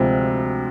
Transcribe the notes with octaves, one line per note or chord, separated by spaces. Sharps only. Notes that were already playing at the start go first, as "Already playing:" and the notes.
Already playing: D2 C3 F3 G#3 C4